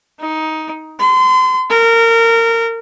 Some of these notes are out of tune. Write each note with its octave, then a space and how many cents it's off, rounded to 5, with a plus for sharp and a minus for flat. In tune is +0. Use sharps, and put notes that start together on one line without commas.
D#4 +15
C6 -35
A#4 -25